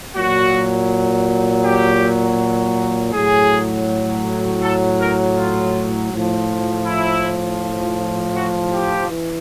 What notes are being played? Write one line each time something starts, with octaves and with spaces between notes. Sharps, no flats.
A#2 F#3 F#4
G4
A2 F#3 G#4
A4
A#4
F4
A2 F3
E4
F#4
G4
E3